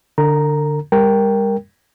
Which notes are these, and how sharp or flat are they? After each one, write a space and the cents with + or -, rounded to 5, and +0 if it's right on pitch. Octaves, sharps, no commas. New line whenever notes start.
D3 +0 A#4 -45 A#5 +0
G3 +40 A#4 +0 G5 +0